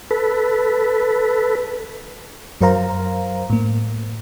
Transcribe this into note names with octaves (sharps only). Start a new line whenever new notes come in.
A4 B4
F#2 F#3 A#4 C5 F5 A#5
A2 A#3